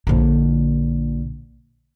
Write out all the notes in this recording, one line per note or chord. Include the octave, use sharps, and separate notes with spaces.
A#1 D3